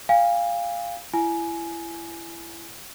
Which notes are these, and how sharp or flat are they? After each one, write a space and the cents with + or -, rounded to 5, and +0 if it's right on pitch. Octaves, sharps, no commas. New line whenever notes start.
F5 +0 G#5 -40
E4 +25 G#5 +15